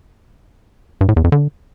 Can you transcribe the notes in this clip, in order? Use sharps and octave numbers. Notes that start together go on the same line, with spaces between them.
G2
A2
E2
F2
D3